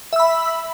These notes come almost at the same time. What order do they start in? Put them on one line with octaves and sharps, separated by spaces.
E5 E6 B5